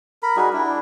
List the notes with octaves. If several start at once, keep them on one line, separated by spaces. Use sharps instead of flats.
A#4 B5
G3 D#4 F#4 G#4
D4 E4